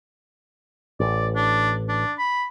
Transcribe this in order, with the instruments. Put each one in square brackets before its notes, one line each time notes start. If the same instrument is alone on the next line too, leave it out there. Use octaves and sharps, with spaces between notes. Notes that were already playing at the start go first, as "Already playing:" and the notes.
[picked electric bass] A1 [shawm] D5
[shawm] D4
D4
B5